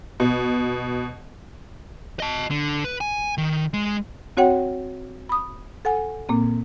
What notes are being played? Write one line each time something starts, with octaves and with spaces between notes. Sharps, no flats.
B2
D#5 A5
D3
B4
G#5
D#3
G#3
C4 F#4 C#5 F#5 G5
B5 D#6
A4 F#5 G#5
A#2 A#3 C4